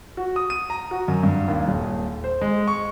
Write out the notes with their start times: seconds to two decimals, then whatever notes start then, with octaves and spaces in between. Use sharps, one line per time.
0.17 F#4
0.36 D#6
0.50 D#7
0.70 A#5
0.91 F#4
1.08 F#2
1.23 G2
1.48 D#2
1.68 D#1
2.24 C5
2.41 G#3
2.68 C#6